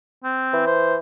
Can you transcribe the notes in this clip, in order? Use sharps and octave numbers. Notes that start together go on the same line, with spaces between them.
C4
E3
C5